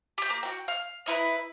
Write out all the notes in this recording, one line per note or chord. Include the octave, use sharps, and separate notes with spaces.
G4 G6
A#3
F#4 G5
F5
D#4 E4 B4